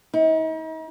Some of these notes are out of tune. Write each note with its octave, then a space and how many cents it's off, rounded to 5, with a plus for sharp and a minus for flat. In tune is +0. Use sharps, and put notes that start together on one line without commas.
D#4 +40